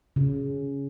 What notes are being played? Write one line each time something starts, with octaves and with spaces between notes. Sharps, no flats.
C#3